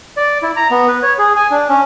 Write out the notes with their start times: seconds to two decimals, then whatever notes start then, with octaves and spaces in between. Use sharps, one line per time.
0.17 D5
0.43 E4
0.56 A#5
0.71 B3
0.88 B4
1.03 C#5
1.19 G#4
1.36 G#5
1.51 D4
1.69 C#4